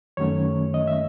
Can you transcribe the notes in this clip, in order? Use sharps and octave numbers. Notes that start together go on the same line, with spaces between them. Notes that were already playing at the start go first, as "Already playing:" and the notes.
F#2 D#3 F#3 A3 C#4 C#5
D#5
E5